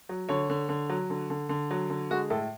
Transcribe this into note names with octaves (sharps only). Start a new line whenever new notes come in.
F#3
D3 C#5
D3
D3
F#3
D3
D3
D3
F#3
D3
G#3 F#4
A2 A4